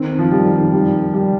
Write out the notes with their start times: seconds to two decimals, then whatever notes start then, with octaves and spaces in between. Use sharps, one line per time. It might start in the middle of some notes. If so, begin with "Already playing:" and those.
Already playing: D#3 C4
0.19 F3
0.32 G3
0.45 D#3
0.73 G3
1.14 G3